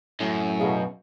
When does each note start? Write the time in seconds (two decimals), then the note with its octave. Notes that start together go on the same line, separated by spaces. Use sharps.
0.20 F#2 A2
0.60 B2 G#4 F5 A5